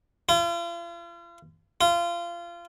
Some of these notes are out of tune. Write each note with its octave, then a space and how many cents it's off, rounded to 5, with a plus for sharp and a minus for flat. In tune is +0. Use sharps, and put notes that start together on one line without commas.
F4 -40
F4 -25